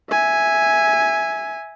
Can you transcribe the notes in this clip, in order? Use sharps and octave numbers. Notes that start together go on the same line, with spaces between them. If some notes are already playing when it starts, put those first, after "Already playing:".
E5 G#5